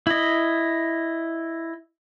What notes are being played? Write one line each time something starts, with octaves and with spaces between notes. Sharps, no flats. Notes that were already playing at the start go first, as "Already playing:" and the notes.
E4 D#5